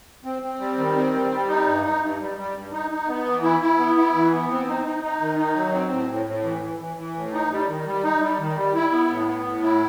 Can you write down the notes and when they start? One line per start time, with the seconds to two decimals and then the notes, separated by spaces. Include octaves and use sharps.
0.25 C4
0.42 C4
0.60 G3
0.77 D#3
0.96 C4
1.14 G3
1.31 G3
1.48 D#4
1.66 G2
1.84 D#4
2.01 G2
2.20 G3
2.37 G3
2.55 G2
2.72 D#4
2.91 D#4
3.08 B3
3.25 E3
3.43 E4
3.61 E4
3.79 B3
3.97 E4
4.15 E3
4.32 B3
4.50 C4
4.67 D#4
4.84 D#4
5.03 D#4
5.21 D#3
5.38 D#4
5.56 F#3
5.73 C4
5.91 A2
6.08 A2
6.26 A2
6.44 E3
6.62 E3
6.79 E3
6.97 E3
7.15 A2
7.32 D#4
7.51 G3
7.68 D#3
7.86 G3
8.03 D#4
8.21 G3
8.39 D#3
8.56 G3
8.75 E4
8.92 B3
9.10 A2
9.27 B3
9.45 A2
9.63 E4